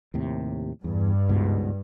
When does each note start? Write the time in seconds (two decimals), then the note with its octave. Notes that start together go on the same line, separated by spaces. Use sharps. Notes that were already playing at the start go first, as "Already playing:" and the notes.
0.14 D#2 A2 C3
0.84 E2 G2
1.29 C#2 G#2 B2